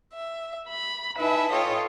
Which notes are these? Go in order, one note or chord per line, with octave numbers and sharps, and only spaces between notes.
E5
B5
D#4 E4 B4 E5 G#5 A5
F4 A4 C#5 D#5 G5